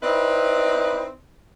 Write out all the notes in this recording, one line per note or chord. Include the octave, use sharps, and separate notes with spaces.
C4 D#4 E4 B4 D5